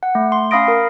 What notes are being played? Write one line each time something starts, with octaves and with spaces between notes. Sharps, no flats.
F#5
A3
C6
C#4 F5 B5 D#6 A#6 D7
A#4